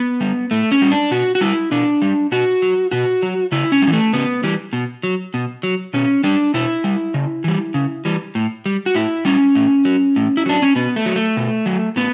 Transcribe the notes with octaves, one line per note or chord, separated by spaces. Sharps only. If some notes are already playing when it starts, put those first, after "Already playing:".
Already playing: B3
G3
A2 A3
C#4
G3
D4
B2 F#4
F#4
G3 E4
B2 D4
G3
B2 F#4
F#3
B2 F#4
F#3
C#3 E4
C#4
G3
E3
A3
C#3 B3
E3 G3
B2
F#3
B2
F#3
B2 C#4
G3 D4
B2 E4
G3
C#3
E3 G3
C#3
E3 G3
A2
G3
F#4
A2 E4
G3 C#4
A2
F#3
A2
E4
F#3 D4
C#4
B2 B3
A3
F#3
A3
B2
F#3
A2 B3